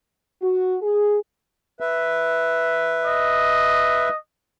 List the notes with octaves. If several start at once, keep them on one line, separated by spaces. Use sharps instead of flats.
F#4
G#4
B4 E5
D#5